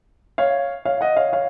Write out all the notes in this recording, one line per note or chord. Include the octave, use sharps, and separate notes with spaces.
C#5 F5
C#5 F5
D#5 F#5
C#5 F5
C#5 F5